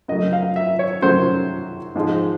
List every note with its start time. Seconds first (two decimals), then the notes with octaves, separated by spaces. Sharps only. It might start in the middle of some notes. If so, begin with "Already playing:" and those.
0.08 F#2 C#3 F#3 A3 D#5
0.33 F5
0.56 E5
0.79 C#5
1.02 F#2 C#3 F#3 A3 C5
1.95 G#2 F3 G#3